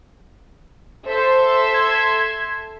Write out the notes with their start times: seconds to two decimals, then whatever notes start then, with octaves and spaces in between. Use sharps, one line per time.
1.06 A4 C5 E5 C6
1.74 G#6